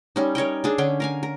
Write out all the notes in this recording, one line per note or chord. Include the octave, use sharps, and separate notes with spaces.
G3 C#4 D#4
A#4 C#5 D#5 G5
D4 G#4 A4
D3 C#4 G5
A#4 F5 G#5
A#4